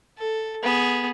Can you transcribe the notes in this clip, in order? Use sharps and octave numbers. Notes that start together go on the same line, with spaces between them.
A4
B3 G#4